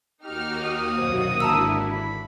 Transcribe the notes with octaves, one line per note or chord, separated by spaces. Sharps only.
D#2 A#3 D#4 F#4 G4 F6
D#6
C2 F#2 B2 C5
G#1 D3 E4 A5 A#5 E6
B5